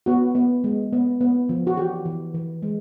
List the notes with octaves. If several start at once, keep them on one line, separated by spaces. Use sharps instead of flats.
B3 F#4
B3
G#3
B3
B3
F3
F#4
E3 G4
E3
E3
G#3